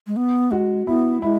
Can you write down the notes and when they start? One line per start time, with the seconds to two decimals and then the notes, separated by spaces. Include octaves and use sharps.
0.07 G#3
0.16 B3
0.51 G#3 F#4
0.87 B3 E4
1.22 G#3 E4